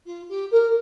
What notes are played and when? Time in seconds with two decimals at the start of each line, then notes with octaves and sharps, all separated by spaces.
0.06 F4
0.29 G4
0.51 A#4